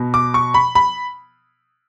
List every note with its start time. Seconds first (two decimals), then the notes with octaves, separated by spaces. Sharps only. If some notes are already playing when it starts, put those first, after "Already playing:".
Already playing: B2
0.14 D6
0.34 C#6
0.54 B5
0.75 B5